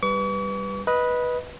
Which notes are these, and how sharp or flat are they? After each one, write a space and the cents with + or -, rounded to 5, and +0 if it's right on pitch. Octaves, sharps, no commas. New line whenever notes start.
G3 +0 B4 +0 C#6 +45
B4 -10 D#5 +10